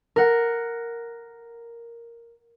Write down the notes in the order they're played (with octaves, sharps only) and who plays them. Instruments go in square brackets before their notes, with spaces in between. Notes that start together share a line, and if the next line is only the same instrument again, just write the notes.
[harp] A#4 F#5